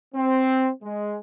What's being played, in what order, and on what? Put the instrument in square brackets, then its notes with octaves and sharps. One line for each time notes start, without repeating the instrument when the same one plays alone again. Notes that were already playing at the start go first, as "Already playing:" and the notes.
[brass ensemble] C4
G#3